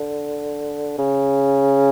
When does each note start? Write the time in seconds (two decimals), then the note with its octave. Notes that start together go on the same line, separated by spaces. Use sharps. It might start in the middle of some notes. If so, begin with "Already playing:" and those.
Already playing: D3
0.98 C#3